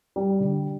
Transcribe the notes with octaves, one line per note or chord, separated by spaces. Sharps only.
G3
D3